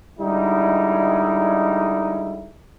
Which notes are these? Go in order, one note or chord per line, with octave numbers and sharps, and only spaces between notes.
D3 G3 G#3 D#4 E4